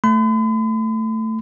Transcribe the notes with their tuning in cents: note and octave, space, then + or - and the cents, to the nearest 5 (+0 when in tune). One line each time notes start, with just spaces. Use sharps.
A3 +10 B5 +45